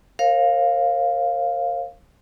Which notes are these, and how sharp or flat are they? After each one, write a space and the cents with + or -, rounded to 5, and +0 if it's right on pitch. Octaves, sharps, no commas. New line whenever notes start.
A#4 +0 C#5 -45 F5 +0